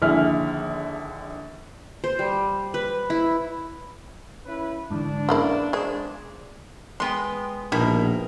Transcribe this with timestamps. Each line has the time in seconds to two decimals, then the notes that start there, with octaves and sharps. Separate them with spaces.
0.02 A#1 D#2 D3 E4 G#4 F6
2.04 C5
2.19 G3
2.74 B4
3.10 E4
4.45 C#4 E4 B4
4.90 G#2 D3 E3 D4
5.29 C#3 A#3 B3 E4
5.73 G#3 G#4 C5 G#5
7.00 G#3 B3 G5 C6
7.72 A#1 B2 D#3 E4 A#4